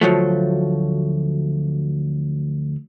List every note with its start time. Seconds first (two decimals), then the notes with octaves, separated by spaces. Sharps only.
0.01 D2 F3 F#3 A3